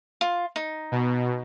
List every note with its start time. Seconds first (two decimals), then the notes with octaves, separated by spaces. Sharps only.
0.21 F4
0.56 D#4
0.92 B2